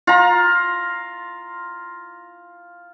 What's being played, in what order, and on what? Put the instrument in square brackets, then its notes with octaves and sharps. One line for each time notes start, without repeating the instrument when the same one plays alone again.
[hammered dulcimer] F4 A#5